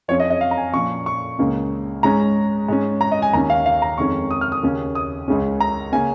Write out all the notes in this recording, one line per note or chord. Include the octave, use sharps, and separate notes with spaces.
F2 F3 C#4 C#5
D#5
D#5
F5
A#5
G#5
A#2 F3 C#4 C#6
C#6
C#2 C#3 A#3 C#4
G#2 G#3 C#4 A#5
G#2 G#3 C#4
A#5
D#5
G#5
D#2 D#3 C#4 A#5
F5
F5
A#5
F2 D#3 G#3 C#4 C#6
D#6
F6
D#6
D#2 C#3 A#3 C#4
D#6
C#2 C#3 G#3 C#4
A#5
C#3 A#3 C#4 G#5